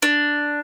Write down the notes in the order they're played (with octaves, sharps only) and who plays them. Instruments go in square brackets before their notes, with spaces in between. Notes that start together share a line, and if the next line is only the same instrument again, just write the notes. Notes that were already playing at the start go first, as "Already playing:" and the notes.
[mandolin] D4